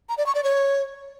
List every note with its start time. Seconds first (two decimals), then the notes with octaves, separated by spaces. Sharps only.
0.09 A#5
0.18 D5
0.26 C#6
0.35 D5
0.44 C#5